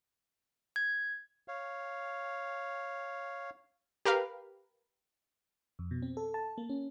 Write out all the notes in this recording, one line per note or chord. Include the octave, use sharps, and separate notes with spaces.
G#6
C#5 F5
G4 A#4 B4 F5
F2
B2
C4
A4
A5
A#3
C#4